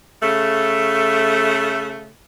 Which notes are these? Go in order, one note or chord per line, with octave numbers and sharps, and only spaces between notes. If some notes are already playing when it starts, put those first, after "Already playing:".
C#3 A3